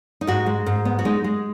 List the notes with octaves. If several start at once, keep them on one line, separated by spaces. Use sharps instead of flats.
D#4
G#2 F#4
G#3
G#2
B3
F#4
G#3 D#4
G#3